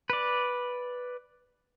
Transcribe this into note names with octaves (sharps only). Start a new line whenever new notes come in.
B4 D5